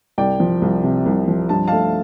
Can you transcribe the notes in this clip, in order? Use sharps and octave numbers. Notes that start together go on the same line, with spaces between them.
C2 D5 G5
F3
C2
C3
C2
F3
G2 A5
A3 F5 A5